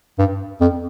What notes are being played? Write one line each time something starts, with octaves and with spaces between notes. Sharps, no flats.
G2
F2